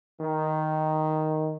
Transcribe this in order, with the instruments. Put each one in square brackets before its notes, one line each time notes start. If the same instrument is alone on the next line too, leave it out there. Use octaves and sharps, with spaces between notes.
[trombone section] D#3